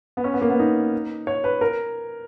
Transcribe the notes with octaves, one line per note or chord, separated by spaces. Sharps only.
B3
C#4
B3
A#3
B3
D#4
C#5
B4
A#4